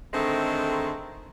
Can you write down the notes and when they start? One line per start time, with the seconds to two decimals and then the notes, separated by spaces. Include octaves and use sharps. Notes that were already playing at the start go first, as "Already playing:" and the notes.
0.14 D3 D#3 G#3 A3 C4